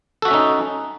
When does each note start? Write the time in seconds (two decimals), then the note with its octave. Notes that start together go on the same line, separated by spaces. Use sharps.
0.22 A4
0.25 F#4
0.28 E5
0.31 C#4
0.34 D#4